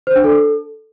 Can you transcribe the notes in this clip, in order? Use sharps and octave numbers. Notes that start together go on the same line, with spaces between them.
C5
D4
A4